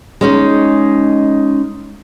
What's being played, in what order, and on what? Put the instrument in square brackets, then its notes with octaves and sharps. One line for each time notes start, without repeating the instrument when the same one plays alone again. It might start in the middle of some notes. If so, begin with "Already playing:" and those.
[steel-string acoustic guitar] G#3 C#4 D#4